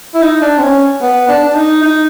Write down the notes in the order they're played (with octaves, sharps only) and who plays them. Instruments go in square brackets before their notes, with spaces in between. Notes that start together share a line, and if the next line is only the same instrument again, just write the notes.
[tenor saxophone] E4
D#4
D4
C4
C#4
B3
D4
D4
D#4
D#4